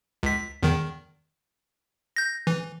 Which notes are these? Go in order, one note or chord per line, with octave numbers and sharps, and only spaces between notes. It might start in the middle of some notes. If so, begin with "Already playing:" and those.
C#2 B6
E2 D#3
G6 A#6
E3